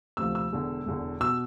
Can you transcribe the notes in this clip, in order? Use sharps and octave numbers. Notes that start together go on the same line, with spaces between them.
D2 C3 F3 E6
E6
E1 E2 D3
E1 E2 D3
B2 E6